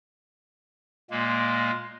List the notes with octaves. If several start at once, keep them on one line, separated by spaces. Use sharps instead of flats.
A#2 G#3 A#3